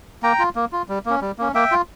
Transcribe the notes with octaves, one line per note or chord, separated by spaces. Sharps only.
A#3 G5 A#5
F4
A#3
F4
G3
A#3 C#4
G3
A#3 C#4
A#3 E5 G5
F4